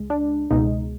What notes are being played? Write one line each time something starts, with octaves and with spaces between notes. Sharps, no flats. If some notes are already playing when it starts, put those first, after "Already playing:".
Already playing: C#2 G#3
D4
C#2 B2 G#3 D#4